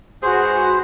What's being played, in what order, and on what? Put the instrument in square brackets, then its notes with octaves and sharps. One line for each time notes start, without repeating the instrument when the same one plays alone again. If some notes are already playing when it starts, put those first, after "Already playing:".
[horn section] G#2 G#4 B4 [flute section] F#4 [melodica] C5